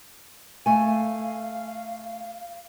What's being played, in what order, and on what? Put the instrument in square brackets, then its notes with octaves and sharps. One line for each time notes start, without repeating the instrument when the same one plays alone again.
[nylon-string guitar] A3 G#5 [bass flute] F5